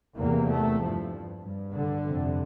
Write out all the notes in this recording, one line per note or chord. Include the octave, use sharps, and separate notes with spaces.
E2 C3 A#3
A3
G2 F3
G2
D3
F2 C3